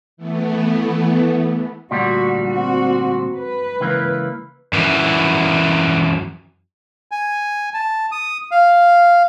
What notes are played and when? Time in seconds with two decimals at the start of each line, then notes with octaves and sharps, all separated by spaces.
0.17 E3 A3 B3
1.91 D2 A#2 G3 F#4
2.47 C4 F#4
3.37 B4
3.80 C#2 E3 A#3
4.73 F#2 E3
7.11 G#5
7.74 A5
8.12 D#6
8.51 F5